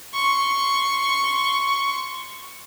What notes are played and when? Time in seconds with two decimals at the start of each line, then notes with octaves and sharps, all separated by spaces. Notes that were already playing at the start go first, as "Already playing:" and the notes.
0.14 C6 C#6